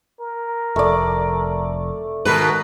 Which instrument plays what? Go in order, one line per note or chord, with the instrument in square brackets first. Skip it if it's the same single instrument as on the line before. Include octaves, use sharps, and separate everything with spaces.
[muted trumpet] A#4
[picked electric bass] F1 [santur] A3 D5
[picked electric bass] G#2 D#3 [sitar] B2 B4 [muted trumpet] A#4